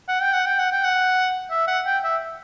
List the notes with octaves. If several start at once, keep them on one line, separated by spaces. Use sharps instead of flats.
F#5
G5
F#5
G5
F#5
G5
F#5
E5
F#5
G5
E5